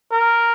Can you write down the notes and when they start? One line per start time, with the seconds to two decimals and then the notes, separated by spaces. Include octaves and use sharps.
0.12 A#4